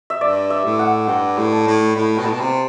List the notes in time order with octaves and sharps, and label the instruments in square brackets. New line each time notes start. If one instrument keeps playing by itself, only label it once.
[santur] E5
[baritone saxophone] G2 [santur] D5
[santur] E5
[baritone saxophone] A2
[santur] F#5
[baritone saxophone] G2 [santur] G5
[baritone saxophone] A2
[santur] A5
[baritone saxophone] A2
[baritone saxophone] A2 [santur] B5
[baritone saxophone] B2 [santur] G5
[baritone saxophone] A2 [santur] A5
[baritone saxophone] B2
C3